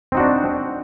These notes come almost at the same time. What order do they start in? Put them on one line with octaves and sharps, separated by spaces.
C4 D#4 F#4 D4